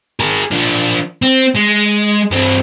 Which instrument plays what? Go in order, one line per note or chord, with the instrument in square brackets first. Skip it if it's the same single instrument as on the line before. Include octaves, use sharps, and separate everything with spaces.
[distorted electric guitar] G#4 A#4
F3 D4
C4
G#3
G2 C4